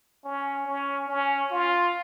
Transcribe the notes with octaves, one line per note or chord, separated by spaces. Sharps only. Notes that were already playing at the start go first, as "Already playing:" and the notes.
C#4
C#4
C#4
F4